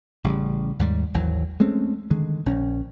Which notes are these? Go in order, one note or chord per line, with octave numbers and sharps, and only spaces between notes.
A1 C#3 G3
D#2 G#2 G3
G#1 D#2 E3 F#3
G#3 A3 C4 C#4
D3 D#3 G#3
A#1 C#4